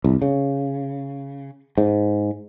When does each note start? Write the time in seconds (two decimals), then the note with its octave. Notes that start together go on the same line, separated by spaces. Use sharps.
0.04 C2
0.22 C#3
1.78 G#2